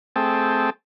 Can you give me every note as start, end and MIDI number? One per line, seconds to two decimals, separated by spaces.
0.16 0.70 57
0.16 0.70 60
0.16 0.70 68
0.16 0.70 79
0.16 0.70 81